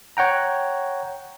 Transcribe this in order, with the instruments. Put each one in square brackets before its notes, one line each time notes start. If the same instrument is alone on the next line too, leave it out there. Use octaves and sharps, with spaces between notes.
[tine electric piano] C#5 F#5 G5 A#5